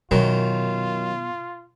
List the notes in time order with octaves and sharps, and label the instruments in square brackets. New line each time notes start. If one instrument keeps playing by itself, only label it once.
[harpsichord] F#2 D#3 [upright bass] B2 [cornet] F4